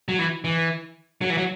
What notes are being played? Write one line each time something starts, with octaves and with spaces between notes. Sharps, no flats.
F#3
E3
E3
F#3
E3
F#3